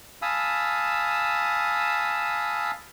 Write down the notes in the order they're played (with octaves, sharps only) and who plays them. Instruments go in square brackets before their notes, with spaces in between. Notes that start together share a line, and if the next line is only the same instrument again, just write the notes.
[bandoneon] F5 G#5 A5 B5 D#6 E6